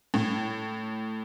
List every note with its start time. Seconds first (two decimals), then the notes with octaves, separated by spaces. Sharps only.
0.14 A2